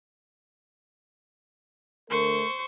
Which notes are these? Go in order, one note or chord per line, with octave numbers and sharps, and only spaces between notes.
D3 A3 A#4 C5 C#6